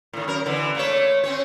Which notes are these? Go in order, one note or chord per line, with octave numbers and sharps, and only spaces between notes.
A2 D#3
F#2 A#4
D3 E3
A3 A#3 C#5
C4 C#4 C#5